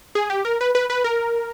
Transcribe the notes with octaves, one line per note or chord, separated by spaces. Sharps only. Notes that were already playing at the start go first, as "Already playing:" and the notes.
G#4
G4
A#4
B4
B4
B4
A#4